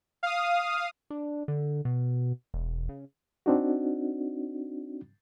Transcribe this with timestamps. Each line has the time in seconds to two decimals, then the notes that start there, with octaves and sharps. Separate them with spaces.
0.23 F5 D#6
1.10 D4
1.48 D3
1.85 B2
2.54 E1
2.89 C#3
3.46 C4 D4 D#4 F#4